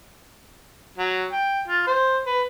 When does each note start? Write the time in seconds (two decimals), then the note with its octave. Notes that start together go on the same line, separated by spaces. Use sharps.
0.98 F#3
1.32 G5
1.68 F4
1.87 C5
2.26 B4